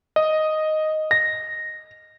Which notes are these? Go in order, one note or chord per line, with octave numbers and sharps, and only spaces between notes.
D#5
A#6